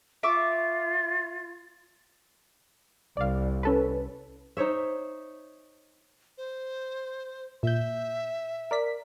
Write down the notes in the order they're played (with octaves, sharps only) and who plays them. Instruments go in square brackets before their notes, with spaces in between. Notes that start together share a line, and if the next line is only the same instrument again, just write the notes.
[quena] F4 [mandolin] E5 C#6 D6
[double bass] C2 [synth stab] D5 F5
[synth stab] C#4 A4 B4
[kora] D#4 C5 C#5 E5
[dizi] C5
[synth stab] A#2 G6 [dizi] E5
[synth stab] A#4 D5 B6